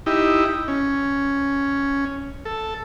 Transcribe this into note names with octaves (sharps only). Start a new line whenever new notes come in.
D#4 E4 G4
C#4
A4